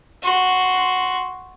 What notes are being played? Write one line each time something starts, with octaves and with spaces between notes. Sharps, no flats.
F#4 C6